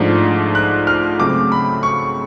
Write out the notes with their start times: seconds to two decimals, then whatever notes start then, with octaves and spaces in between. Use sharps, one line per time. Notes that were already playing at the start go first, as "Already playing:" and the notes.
Already playing: G#2 F3 A3 D4
0.55 F#6
0.87 F6
1.19 C#3 F#3 A3 C4 D6
1.52 B5
1.83 C#6